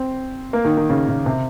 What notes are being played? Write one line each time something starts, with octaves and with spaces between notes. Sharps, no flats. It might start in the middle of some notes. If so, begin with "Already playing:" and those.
Already playing: C4
A#3
D#3
D#3
C#3
C#3
C3